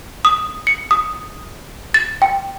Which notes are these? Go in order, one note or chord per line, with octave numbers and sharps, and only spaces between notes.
D#6
C#7
D#6
A6
G5